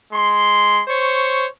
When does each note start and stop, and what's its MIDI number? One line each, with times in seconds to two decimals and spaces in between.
0.13 0.82 56
0.13 0.82 84
0.88 1.47 72
0.88 1.47 73
0.88 1.47 85